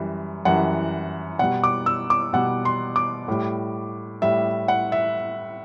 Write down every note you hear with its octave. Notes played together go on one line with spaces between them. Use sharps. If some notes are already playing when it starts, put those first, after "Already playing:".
Already playing: F#2 E3 G3
F#2 E3 G3 F#5
B2 G3 F#5
D6
E6
D6
B2 G3 F#5
C6
D6
A2 G3
A2 G3 E5
F#5
E5